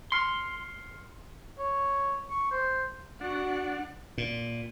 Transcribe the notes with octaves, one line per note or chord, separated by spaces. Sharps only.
C6 F6 C7 C#7
C#5
C#6
C5
D4 F#4 F#5
A#2